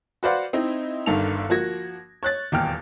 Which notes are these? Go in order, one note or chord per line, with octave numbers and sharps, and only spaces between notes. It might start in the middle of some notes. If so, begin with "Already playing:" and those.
F#4 B4 C5 D5 F5 F#5
C4 D#4 E4 D#5
G1 G2 D3 D#3 A4 F7
F3 A#3 F#4 G#6 A#6
C#5 F#6 A6
D#1 E2 G5 F6